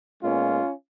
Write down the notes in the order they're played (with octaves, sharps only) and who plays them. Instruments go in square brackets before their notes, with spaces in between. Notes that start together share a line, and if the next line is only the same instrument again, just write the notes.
[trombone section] A#2 G#3 B3 C#4 F4